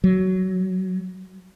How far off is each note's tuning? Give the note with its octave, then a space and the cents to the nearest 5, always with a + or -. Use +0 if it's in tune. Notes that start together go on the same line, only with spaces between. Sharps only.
F#3 +15